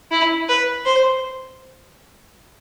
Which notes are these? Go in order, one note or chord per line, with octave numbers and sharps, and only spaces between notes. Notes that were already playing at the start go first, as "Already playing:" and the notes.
E4
B4
C5